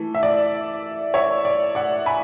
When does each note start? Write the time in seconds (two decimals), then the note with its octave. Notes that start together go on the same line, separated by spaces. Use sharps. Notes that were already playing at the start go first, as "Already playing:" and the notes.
Already playing: E3 A3
0.15 E5
0.23 D5
1.14 C#5 E5
1.45 D5
1.75 D5 F#5
2.06 G#5 B5